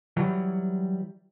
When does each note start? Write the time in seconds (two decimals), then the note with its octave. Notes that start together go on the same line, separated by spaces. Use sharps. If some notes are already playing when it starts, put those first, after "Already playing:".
0.17 E3 F#3 G3